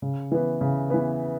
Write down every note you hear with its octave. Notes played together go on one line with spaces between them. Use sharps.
C#3
E3 B3
C#3
E3 B3